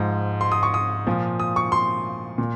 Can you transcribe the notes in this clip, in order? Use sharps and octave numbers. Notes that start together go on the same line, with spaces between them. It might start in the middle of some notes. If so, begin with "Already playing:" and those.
Already playing: G#2 F3
C6
D#6
C#6
D#6
A#2 F3
D#6
C#6
C6
A#2